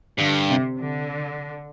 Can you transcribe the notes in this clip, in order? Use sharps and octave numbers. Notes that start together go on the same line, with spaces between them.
G2 D3
C3
D3